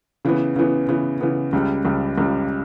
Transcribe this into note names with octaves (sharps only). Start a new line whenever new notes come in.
C#3 E3 B3
C#3 E3 B3
C#3 E3 B3
C#3 E3 B3
C#2 C#3 G3
C#2 C#3 G3
C#2 C#3 G3